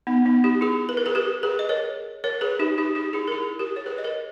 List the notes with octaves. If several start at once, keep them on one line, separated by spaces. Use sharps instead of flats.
B3 D#4
B3 D#4
D#4 G4
E4 G#4
B4
A#4
G#4 B4
G4 A#4
G#4 B4
D#5
A#4 C#5
A#4 C#5
G#4 B4
D#4 G4
D#4 G4
D#4 G4
E4 G#4
A#4
E4 G#4
G4 A#4
C#5
G#4 B4
D#5
A#4 C#5